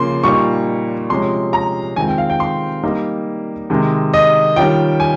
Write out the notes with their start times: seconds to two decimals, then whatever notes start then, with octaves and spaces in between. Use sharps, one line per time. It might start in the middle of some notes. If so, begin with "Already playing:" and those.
Already playing: C#3 F3 A#3 C6
0.24 A#2 G3 A#3 D#4 C#6
1.10 C3 F3 G#3 C#4 C6
1.53 A#5
1.96 D#3 G#3 C4 F4 G#5
2.08 G5
2.18 F5
2.30 G5
2.40 C6
2.83 G3 A#3 D#4
3.70 C3 D#3 G#3
4.14 D#5
4.56 D#3 G3 C#4 F4 G5
5.00 G#5